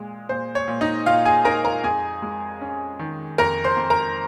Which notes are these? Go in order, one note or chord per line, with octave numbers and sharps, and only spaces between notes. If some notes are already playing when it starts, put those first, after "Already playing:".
Already playing: A#2 G#3
A#2 C5
C#5
A#2
D#4 D#5
A#2 F4 F5
G#4 G#5
D#4 A#4 A#5
A#4 A#5
F2 G#4 G#5
G#3
C#4
D#3
F2 A#4 A#5
C5 C6
F2
A#4 A#5